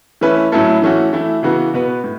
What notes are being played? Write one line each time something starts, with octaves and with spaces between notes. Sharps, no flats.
E3 A3 C#4 E4 B4
A2 F#3 C#4 E4 A4
E3 A3 C#4 F#4
E3 A3 E4
C#3 E3 B3 F#4 B4
B2 B3 F#4 B4
A2